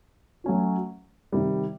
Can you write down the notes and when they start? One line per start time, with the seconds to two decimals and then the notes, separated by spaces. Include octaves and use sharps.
0.44 F#3 A3 C#4 F#4
1.32 C3 D#3 G3